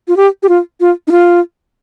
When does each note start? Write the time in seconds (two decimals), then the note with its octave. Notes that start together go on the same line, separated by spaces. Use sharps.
0.08 F4
0.17 G4
0.43 G4
0.49 F4
0.80 F4
1.08 D#4
1.11 F4